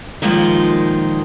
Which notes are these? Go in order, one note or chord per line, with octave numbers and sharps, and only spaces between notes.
A#2 D#3 F3 G#3 A#3 D#4